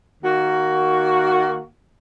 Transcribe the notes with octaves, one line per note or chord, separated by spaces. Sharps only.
D#3 A#3 F#4